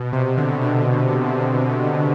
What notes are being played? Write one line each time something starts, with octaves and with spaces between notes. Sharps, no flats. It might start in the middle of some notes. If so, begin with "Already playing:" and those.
Already playing: B2
C3
D3
B2